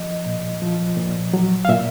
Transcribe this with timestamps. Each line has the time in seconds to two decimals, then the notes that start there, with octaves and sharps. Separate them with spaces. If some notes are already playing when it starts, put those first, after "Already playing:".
Already playing: F3 D#5
0.26 A#2
0.62 F3
0.97 A#2
1.34 F#3
1.65 F5
1.69 A#2 E5